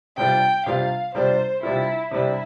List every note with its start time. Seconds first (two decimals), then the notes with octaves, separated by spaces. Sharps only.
0.17 C3 G3 D4 F4 G5
0.66 C3 G3 D4 F4 F5
1.14 C3 G3 D4 F4 C5
1.63 C3 G3 D4 E4 F4
2.11 C3 G3 D4 E4